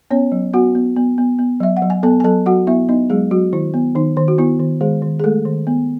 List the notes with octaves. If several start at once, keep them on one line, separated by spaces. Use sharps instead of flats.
B3 C#4 C#5
F#3
B3 F#4 F#5
B3
B3
B3
B3
F#3 E5
F#5
F#3
G#5
B3 A4 A5
G#5
F#3 A4 A5
F#3 F#4 F#5
B3 E4 E5
B3 D#4 D#5
F#3 G#3 G#4
F#3 F#4
D#3 E4
B3
D#3 D#4
D#3
F#4
B3 E4
D#3
D#3 G#3 G#4
D#3
G#4
G#3 A3 A4
D#3
B3